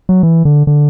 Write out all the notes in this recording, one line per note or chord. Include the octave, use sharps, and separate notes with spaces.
F#3
E3
D3
D3